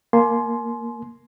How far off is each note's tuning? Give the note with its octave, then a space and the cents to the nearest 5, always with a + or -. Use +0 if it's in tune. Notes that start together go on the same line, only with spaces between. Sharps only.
A#3 +0 G#5 +40 C6 +0